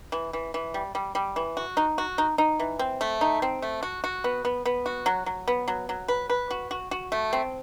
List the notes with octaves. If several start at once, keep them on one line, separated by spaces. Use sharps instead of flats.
E3
E3
E3
G3
G3
G3
E3
F#4
D#4
F#4
D#4
D#4
E3
C4
A3
D#4
C4
A3
F#4
F#4
B3
B3
B3
F#4
F#3
F#3
B3
F#3
F#3
B4
B4
F#4
F#4
F#4
A3
C4